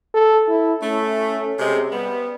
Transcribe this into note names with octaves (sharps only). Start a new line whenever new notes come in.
A4
E4
A3 C#4
C3 G#3
G3 B3